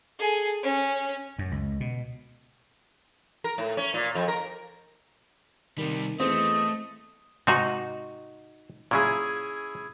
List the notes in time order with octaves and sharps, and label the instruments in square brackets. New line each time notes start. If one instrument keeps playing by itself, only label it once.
[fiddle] G#4 A4
C#4
[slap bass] F#2
C#2
B2
[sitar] A#4
A2
C#4
A#2
F2
A#4
[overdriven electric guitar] C3 G3 [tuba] D#3
[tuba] E2 [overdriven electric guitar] A3 [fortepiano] C4 [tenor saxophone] D#5
[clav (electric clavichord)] G#2 C3 [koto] D#4 F#4
[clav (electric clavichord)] A#2 C#3 F#3 [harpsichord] C#4 E4 G#4